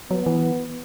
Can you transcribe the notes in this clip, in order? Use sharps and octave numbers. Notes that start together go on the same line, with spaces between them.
F#3 B3
E3